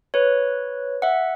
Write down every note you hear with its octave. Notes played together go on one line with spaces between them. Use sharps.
B4 C#5
E5 F#5